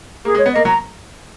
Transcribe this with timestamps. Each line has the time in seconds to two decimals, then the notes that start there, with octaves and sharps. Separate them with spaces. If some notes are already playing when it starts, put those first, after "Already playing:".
0.25 A#3 G#4
0.35 G#3
0.38 C#5
0.46 B3
0.52 A#3 D#5
0.65 F#3 A#5